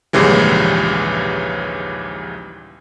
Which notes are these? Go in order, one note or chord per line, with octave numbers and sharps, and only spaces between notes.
A#1 D#2 G#2 C#3 E3 G3